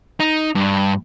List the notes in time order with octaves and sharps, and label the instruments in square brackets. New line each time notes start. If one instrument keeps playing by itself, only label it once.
[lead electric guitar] D#4
G2